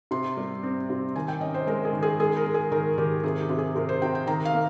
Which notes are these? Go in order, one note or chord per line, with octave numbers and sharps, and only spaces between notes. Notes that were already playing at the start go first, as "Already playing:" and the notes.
C3 C6
G3
C4
C3
D#3 G#5
G5
C#4 D#5
C5
G#3 A#4
G#4
D#3
G#4
G#3 G#4
A#4
G#3
G#4
D#3 A#4
D#3 G4
C3 G#4
G4
C3
G#4
C3 A#4
C5
C3 G5
G5
D#3 A#5
F5
A#3